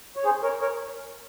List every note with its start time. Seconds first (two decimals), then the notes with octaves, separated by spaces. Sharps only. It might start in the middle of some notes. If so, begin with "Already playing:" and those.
0.16 C#5
0.25 G#4 C5
0.43 A#4 C#5
0.61 A#4 C#5